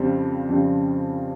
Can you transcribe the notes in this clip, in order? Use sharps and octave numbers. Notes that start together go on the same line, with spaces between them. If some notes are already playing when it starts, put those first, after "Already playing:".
Already playing: F2 C#3 G3 C4
F2 C#3 G3 C4